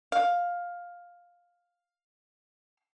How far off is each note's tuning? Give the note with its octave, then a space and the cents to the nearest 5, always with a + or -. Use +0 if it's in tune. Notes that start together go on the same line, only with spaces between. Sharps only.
F5 +10